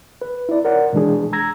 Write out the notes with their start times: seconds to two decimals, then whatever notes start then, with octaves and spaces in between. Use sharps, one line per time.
0.22 B4
0.49 E4 D5
0.65 A#4 C#5 D5 F#5
0.93 B2 E3 G#3 D4 G#4
1.33 A#5 E6 G#6 A#6